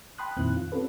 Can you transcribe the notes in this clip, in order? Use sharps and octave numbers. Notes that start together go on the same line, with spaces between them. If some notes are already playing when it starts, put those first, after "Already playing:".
G5 A5 B5 C6 D#6 F#6
F2 A#2 D#3 C4 E4 F#6
F4
C4 C#4 F4 G4 A4 B4